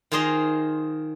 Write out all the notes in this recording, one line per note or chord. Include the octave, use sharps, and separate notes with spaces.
D#3 F4 G#4 C5 D#5 A#5